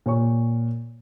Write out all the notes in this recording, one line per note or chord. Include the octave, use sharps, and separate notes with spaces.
A#2 C#5 C#6